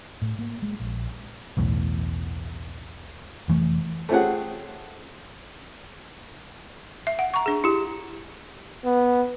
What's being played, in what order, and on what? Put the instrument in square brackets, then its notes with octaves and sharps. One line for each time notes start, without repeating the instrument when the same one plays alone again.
[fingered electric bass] A2
A#3
G#3
A#1
[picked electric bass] B1 E2 A2
F1 E3 A3
[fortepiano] A3 C4 C#4 G4 G#4 F#5
[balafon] E5
F#5
A#5 C#6
D4 G#4
E4 G4
[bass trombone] B3